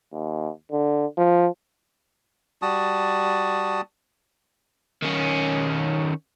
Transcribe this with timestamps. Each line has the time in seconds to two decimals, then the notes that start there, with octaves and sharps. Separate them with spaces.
0.12 D#2
0.72 D3
1.17 F3
2.62 G3 F#4 A5 D#6
5.02 D#3 C#4